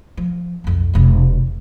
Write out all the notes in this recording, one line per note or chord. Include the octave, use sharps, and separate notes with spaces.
F3
B1 F2
E1 C3